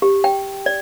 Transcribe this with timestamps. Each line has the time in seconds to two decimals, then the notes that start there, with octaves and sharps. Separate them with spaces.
0.02 G4
0.24 G5
0.66 D5